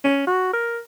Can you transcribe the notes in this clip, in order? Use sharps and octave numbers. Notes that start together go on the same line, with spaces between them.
C#4
F#4
A#4